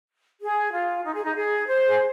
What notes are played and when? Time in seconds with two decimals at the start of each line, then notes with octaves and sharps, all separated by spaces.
0.41 G#4
0.72 F4
1.04 D#4
1.14 G#4
1.24 D#4
1.35 G#4
1.67 C5
1.87 G#4